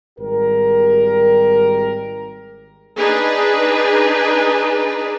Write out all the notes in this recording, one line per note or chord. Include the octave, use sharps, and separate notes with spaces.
G#1 G3 G4 A#4
D4 D#4 G#4 B4